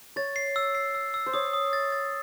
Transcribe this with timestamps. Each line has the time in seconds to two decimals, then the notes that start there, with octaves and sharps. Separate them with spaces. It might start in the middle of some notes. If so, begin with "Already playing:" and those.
0.16 C#5 A6
0.36 C7
0.56 E6
0.75 C7
0.95 E6
1.14 E6
1.26 C5
1.33 C#5 D#6
1.53 D#6
1.73 A6
1.92 A6